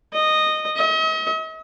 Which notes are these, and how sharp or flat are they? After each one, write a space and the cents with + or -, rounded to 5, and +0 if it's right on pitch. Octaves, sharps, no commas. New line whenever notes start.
D#5 -10
D#5 +45